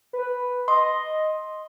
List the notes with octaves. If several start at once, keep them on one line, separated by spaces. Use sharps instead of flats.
B4
D#5 C6